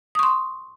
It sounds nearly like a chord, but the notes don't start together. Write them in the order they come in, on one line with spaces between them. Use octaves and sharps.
D#6 C#6 C6